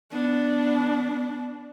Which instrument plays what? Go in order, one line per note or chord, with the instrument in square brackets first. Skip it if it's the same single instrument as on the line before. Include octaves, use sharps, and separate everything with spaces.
[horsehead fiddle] B3 D4